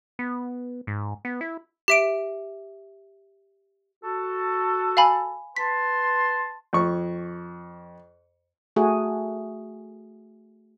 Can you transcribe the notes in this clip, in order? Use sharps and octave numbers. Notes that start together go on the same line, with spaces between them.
B3
G#2
B3
E4
G4 E5 D7
F#4 A4
F5 G#5 B5
B4 A5 C6 B6
F2 C#6
A3 F#4 G#4